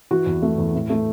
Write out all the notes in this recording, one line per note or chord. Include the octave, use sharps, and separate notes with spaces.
E3 F#4
E2
A3
E2
A2
A3